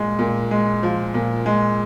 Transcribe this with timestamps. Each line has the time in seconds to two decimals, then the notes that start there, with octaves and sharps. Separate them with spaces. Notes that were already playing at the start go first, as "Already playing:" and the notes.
Already playing: A#2 G#3
0.19 A#2
0.51 G#3
0.83 F3
1.14 A#2
1.46 G#3